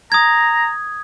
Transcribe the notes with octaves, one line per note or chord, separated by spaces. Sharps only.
A#5 D#6 G#6